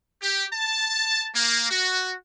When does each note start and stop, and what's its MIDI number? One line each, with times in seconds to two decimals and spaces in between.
0.22 0.45 67
0.53 1.27 81
1.34 1.68 58
1.70 2.12 66